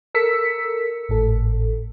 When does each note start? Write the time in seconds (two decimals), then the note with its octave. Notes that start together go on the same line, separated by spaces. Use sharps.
0.14 A4 A#4 E6 B6 C#7
1.09 G#1 A2 A4